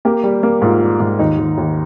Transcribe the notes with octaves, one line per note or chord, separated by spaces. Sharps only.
A#3 G4
G3
A#3
G#2 F4
G3
G#2
D#2 D#4
D#2
D#2